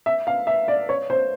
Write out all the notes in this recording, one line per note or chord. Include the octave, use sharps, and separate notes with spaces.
E5
F5
E5
D5
C#5
C5